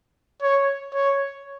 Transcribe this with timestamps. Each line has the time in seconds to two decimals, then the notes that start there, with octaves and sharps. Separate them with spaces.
0.42 C#5
0.94 C#5